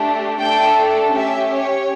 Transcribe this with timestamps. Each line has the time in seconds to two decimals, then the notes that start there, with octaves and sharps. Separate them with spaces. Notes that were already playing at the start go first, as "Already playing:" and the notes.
Already playing: A3 D4 G4
0.40 A3 D4 A4 G5
1.14 C#4 G4 E5
1.51 C#5